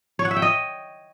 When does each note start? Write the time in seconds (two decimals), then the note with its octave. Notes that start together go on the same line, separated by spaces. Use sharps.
0.19 C#5
0.25 F#5
0.31 E5
0.36 G5
0.42 D#5